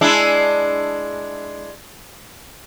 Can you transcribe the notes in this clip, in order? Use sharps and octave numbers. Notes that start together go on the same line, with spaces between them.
G#3 D4 E4